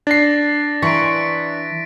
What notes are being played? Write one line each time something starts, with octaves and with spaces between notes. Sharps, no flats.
D4 A6 A#6 C7
E3 A#5 C6 C#6 B6 D7